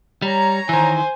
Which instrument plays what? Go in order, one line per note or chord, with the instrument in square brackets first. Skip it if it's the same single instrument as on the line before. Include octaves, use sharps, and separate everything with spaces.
[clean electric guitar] G3 [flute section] C#5 A#5
[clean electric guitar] D#3 E3 [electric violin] C5 G#5